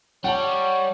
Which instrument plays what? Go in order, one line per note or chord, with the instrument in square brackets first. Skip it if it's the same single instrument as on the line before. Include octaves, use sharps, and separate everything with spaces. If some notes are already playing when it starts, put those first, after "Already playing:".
[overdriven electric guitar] G3 [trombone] C#5 [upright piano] F#5 A5